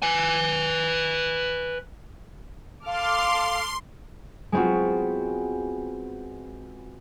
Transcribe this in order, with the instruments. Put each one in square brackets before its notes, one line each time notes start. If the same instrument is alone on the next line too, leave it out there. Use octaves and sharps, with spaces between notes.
[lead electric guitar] B4 G#5
[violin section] A4 D6 F6 [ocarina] F5 [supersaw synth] C6
[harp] G#3 B3 C4 F4 F#4